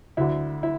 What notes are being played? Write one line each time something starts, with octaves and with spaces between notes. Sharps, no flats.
D2 D3 E4
E4